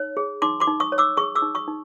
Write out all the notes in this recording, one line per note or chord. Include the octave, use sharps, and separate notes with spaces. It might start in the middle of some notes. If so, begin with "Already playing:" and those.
Already playing: D#4 C#5
G#4
D#4 C6 D6
C6 D6
D#4
C#6 D#6
C#5
D6 E6
G#4 C#6 D#6
D6 E6
D#4
C#6 D#6
D#4